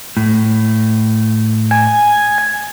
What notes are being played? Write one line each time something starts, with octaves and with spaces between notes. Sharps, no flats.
A2
G#5